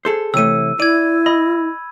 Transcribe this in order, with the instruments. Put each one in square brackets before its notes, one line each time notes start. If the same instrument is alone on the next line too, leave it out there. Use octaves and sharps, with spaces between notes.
[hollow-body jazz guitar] G#4 A4 C5
[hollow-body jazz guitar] C3 E3 A3 [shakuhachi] C#5 [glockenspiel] E6 D#7
[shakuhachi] E4 [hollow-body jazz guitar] D5 [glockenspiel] G#6 D#7
[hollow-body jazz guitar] D#5 [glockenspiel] B5